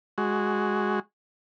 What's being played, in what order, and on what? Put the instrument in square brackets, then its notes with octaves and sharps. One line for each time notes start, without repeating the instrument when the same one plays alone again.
[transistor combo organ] G#3 F#4